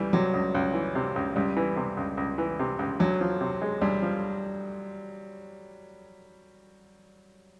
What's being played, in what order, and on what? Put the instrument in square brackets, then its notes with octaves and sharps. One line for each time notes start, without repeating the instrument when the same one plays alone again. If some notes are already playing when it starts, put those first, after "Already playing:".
Already playing: [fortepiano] C#2 E3 [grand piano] G3
[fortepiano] C3 [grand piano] F#3
[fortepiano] C#2
C#2
E3
C3
C#2
[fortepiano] C#2 [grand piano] G3
[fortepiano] E3
C3
C#2
C#2
E3
C3
C#2
[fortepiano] D2 [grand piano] F#3
[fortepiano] F3
C3
G#3
[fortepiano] D2 [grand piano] G3
[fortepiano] F3